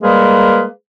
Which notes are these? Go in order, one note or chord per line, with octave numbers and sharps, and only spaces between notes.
G3 G#3 A#3 G#4 A#4 B4